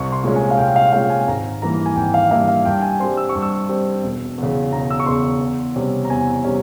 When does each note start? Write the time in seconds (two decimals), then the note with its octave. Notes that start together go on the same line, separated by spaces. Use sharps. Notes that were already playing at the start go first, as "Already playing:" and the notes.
Already playing: C2 C#6
0.12 C6
0.24 A#2 G#3 C#4
0.36 G#5
0.51 F5
0.58 C2 G5
0.76 F5
0.87 G5
0.93 A#2 G#3 C#4 F5
1.10 G#5
1.27 G#1 A#5
1.62 G2 E3 A#3 A#5
1.86 G#5
1.96 G#1 G5
2.14 F5
2.30 G2 E3 A#3 E5
2.48 F5
2.65 G2 G5
2.82 G#5
3.00 G3 C4 C6
3.17 E6
3.29 C#6
3.35 G2
3.42 E6
3.69 G3 C4
4.04 E1
4.38 E2 C#3
4.72 E1 A#5
4.91 E6
5.00 C#6
5.06 E2 C#3 C6
5.41 E2
5.76 C3 G3 C#4
6.05 A#5
6.10 E2 G#5
6.44 C3 G3 C#4